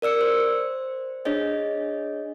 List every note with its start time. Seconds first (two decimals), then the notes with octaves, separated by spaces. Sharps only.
0.02 A#4 D5 E6 C#7
0.21 C5
1.25 D4 G#4 C#5 D#5